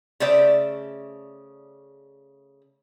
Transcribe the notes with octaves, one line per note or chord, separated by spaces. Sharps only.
C#3 A3 C5 D5 E5